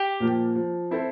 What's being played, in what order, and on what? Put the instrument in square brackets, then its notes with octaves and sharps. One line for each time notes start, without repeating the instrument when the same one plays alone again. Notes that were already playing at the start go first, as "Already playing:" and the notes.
Already playing: [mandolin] G4
[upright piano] A#2 F3 A#3
F3
C4 E4 A4 C5